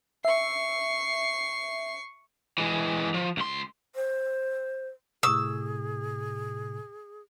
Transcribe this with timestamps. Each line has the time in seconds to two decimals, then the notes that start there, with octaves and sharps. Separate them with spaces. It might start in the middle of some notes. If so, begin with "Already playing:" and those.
0.25 E5 C#6 C7
2.58 E3 G#3
3.14 F3
3.37 C#2 C6
3.95 C5
5.23 A2 C3 G#4 C#6 D#6 E6